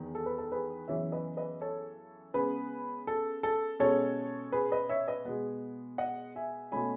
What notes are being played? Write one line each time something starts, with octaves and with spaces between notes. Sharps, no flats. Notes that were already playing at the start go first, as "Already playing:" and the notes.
Already playing: E2 D#3 B3
A4
B4
A4
G#4 B4
F#2 C#3 E3 B3 C#5 E5
B4 D#5
B4 D#5
A4 C#5
C#3 G#3 B3 G#4 B4
A4
A4
B2 G#3 C#4 A4 C#5
G#4 B4
B4 D#5
C#5 E5
B4 D#5
B2 G#3 B3
D#5 F#5
E5 G#5
B2 A3 C#4 G#5 B5